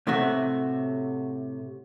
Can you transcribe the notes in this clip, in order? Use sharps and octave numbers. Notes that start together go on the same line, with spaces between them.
A2 C3 A3 F#4